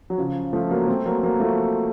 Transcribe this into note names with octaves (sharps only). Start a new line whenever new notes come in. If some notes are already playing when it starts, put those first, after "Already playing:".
F#3
C#3 F3
F3 A3
F#3 A#3
A3 C4
F#3 A#3
F#3 A#3
F3 A3